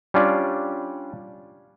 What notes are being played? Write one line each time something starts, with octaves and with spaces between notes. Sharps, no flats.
G3 C#4 D4 F4 D5